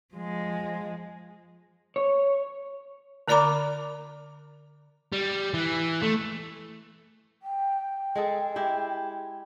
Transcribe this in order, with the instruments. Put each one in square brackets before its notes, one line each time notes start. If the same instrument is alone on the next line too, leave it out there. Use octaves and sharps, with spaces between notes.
[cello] F3 G#3
[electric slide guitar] C#5
[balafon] D3 A#4 D5 A#5 B5 D6
[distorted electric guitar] G3
E3
A3
[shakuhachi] G5
[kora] G#3 G#4 A4
G#3 E4 G4